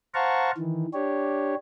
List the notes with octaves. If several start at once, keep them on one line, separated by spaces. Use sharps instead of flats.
C5 F5 F#5 A5 A#5 C#6
D#3 E3
D4 G4 C#5